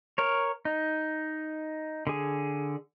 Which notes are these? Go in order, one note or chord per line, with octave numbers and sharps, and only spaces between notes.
A#4 C#5
D#4
D3 G#4